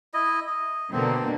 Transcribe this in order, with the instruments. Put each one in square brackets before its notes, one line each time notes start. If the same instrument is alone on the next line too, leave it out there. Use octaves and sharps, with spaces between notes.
[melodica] E4 D#5
D#5
[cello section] B2 D3 A#3 [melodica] C4